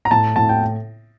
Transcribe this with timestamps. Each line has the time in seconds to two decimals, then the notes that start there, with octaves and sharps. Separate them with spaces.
0.05 A#5
0.11 A2 A5
0.36 A2 A5
0.49 G5